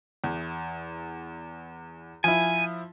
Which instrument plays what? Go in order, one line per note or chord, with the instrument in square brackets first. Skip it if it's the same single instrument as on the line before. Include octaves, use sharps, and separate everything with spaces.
[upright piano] E2
[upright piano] F3 E4 [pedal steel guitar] G#5